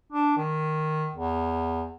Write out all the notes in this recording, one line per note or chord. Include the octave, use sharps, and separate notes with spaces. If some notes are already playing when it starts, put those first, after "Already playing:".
D4
D#3
E2